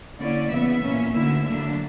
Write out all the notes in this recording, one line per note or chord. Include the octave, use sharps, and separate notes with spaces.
D3 A#3 C#4 E4 D5
C#3 E3 B3 E5
A#2 A#3 C#4
D2 D3 A#3 E4 E5
D3 F#3 A#3 D4